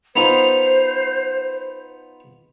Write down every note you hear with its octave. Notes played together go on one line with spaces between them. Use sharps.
B3 D#4 F4 C5